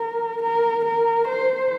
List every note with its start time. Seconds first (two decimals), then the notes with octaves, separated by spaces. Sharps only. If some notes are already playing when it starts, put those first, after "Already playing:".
Already playing: A#4
0.43 A#4
0.85 A#4
1.28 C5